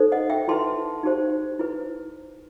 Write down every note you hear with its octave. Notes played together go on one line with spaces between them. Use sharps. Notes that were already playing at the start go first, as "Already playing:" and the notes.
Already playing: D#4 A4 C5
D#5 F#5
E5 G5
E4 B4 A5 C6
D#4 G4 C5
E4 B4